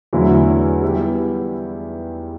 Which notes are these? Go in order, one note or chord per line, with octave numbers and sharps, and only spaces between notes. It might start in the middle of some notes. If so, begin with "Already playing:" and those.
E2 D3 F#3 A3 E4
G3 B3 E4 G4